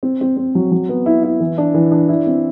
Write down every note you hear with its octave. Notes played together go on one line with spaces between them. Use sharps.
C4
C4
C4
F#3
F#3
B3
E4
E4
E3
D4
E3
D4
E4
C4